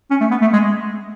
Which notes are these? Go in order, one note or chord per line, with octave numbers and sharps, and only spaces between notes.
C#4
A3
B3
A3
G#3